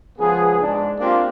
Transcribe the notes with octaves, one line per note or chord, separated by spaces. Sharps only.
C#2 F3 B3 G#4
G#2 D4
A#3 C4 D4 F4 G4 C5